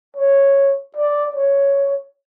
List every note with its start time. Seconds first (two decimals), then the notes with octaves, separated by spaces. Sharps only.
0.16 C#5
0.97 D5
1.36 C#5